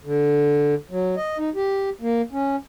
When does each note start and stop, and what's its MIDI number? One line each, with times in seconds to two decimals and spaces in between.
0.05 0.75 50
0.91 1.15 54
1.17 1.37 75
1.38 1.50 63
1.55 1.90 67
2.01 2.22 58
2.32 2.56 61